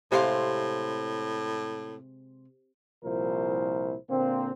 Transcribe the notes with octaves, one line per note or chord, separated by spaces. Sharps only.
A2 C3 G#3 C5 F5
C2 A#2 F3 E4 A#4 C5
A#2 D3 A#3 C4